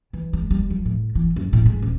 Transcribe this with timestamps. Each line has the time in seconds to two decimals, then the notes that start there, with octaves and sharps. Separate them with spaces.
0.13 E3
0.33 G#3
0.51 G3
0.70 F3
0.85 A2
1.15 E3
1.36 F#2
1.53 A2
1.66 G#3
1.82 D#1